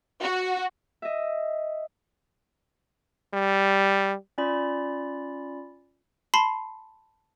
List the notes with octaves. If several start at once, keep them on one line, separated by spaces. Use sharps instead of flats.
F#4
D#5 E5
G3
C#4 F4 D5 B5
A5 B5 C6 C7